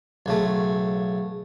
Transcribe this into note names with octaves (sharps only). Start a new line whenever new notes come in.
B1 C#3 A3